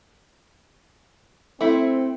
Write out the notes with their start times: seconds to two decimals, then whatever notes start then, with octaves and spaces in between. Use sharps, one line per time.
1.61 A3 C4 E4